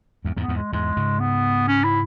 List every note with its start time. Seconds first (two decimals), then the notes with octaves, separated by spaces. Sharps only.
0.25 E2 G#2
0.36 E2 G#2
0.41 B3
0.48 E2 G#2
0.56 G#3
0.73 E2 G#2 G#3
0.97 G#2 C#3
1.20 B3
1.68 C#4
1.84 E4